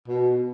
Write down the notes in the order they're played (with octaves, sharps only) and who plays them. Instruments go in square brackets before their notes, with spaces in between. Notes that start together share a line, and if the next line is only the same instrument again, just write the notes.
[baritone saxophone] B2